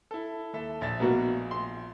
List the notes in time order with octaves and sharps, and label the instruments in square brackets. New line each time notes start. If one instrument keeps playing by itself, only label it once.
[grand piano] E4 A4
D#2 A4 E5
A#1 E5 A6
[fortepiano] B2 A#3 F#4
C6